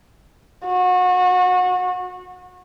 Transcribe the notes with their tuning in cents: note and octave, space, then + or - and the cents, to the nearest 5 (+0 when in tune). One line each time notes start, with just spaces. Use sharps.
F#4 -30